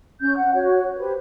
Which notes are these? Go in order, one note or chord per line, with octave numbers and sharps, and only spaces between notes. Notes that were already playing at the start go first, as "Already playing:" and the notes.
C#4 G6
F#5
F#4 C#5
G4 B4 C5